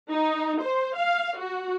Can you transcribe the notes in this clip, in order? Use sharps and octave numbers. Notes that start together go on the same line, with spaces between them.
D#4
C5
F5
F#4